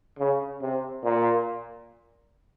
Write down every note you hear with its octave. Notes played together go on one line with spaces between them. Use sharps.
C#3
C3
A#2